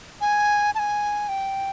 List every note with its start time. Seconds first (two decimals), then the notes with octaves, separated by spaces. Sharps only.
0.21 G#5
0.75 A5
0.79 G#5
1.29 G5